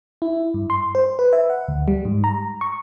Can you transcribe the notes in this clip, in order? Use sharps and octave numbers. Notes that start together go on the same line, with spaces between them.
E4
G2
C6
C5
B4
E5
F#5
D2
G3
G#2
A#5
C#6